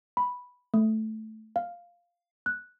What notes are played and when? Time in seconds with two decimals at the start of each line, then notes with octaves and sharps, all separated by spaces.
0.17 B5
0.74 A3
1.56 F5
2.46 F#6